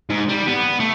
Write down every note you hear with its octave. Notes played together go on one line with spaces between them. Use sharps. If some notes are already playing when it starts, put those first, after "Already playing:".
G#2
G3
B3
A3